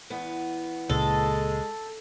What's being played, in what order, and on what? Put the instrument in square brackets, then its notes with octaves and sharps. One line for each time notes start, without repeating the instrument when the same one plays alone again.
[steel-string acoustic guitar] E2 B3
[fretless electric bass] C#2 A#2 [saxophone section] G#3 [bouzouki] A4